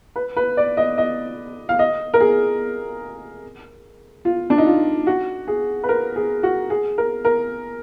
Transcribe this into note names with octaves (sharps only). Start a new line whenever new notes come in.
B4
B4
D5
D#5
D#5
F5
D#5
A#4
G#4
F4
D4
D#4
F4
F#4
G#4
B4
A#4
G#4
F#4
G#4
A#4
A#4